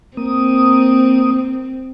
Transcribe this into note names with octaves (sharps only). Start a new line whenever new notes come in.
A#3 C4 D#6